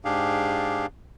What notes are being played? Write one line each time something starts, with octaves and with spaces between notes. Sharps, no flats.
G#2 D4 G4 G#4 F5